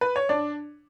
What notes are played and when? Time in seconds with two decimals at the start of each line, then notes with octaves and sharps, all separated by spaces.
0.01 B4
0.16 C#5
0.29 D4 D5